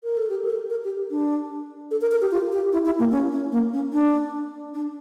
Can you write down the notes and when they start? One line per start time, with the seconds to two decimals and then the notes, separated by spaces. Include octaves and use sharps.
0.03 A#4
0.17 A4
0.29 G4
0.45 A#4
0.50 A4
0.70 A#4
0.84 G4
1.11 D4
1.91 A4
2.01 A#4
2.11 A#4
2.21 G4
2.31 F4
2.52 G4
2.72 E4
2.85 E4
2.99 A#3
3.12 C#4
3.32 C#4
3.52 A#3
3.73 C#4
3.93 D4
4.74 D4